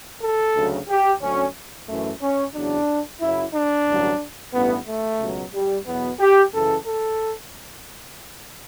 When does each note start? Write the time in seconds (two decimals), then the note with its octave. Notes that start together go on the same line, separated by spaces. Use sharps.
0.22 A4
0.56 D2 C#3 F#3
0.89 G4
1.21 D2 D3 F#3 C#4
1.89 F#2 E3 A3
2.21 C#4
2.55 E2 C#3 F#3 D4
3.21 F#2 C#3 F#3 E4
3.54 D4
3.87 A1 G2 D3 F#3
4.54 A1 G2 E3 B3
4.87 A3
5.20 C#2 B2 F#3
5.54 G3
5.87 E2 B2 F#3 B3
6.20 G4
6.53 F#2 C#3 E3 A4
6.87 A4